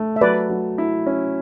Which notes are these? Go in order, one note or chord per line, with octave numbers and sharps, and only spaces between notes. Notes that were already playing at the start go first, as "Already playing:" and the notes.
Already playing: A3
E5
F#3 B4 D5
F#3
E4
C#4